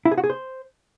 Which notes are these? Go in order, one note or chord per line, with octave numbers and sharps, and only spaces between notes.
E4
G#4
F#4
G#4
C5